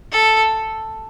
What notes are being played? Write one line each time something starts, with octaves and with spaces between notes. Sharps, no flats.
A4